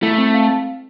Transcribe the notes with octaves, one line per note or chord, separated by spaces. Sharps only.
A3 E4
C4
F5